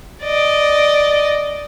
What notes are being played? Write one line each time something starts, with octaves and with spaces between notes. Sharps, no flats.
D5 D#5